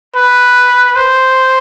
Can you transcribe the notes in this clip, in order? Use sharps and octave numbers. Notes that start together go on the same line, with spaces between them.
B4
C5